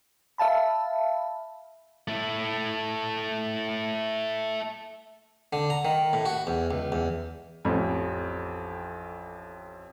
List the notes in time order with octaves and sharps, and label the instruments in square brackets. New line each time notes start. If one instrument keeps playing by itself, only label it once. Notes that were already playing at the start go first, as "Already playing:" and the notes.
[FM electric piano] E5 F5 A5 B5
[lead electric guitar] A3 E4
[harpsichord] D3
A#5
D#3
A2
F#4
E2
C#2
E2
[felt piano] A1 F2